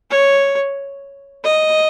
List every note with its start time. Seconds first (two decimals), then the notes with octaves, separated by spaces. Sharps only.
0.10 C#5
1.44 D#5